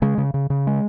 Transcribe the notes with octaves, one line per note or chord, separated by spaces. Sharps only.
C#3 G#3
C#3
C#3
C#3
G#3